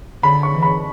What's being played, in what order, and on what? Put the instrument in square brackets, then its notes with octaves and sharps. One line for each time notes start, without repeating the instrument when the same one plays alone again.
[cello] D3 [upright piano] B5
[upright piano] C#6
[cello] E3
[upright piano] B5